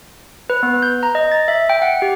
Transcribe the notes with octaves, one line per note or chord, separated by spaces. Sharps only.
B4
B3
G6
A#5
D#5
A6
E5
G5
F#5
G4